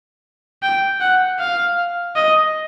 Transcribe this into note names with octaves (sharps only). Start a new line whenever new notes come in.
G5
F#5
F5
D#5